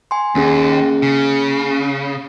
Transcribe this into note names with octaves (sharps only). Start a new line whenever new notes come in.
G#5 C6
D#2 A#3 C#4 G#4
C#3